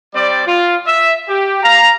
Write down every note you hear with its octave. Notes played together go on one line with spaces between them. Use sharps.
G3 C4 D5
F4
E5
G4
F5 A#5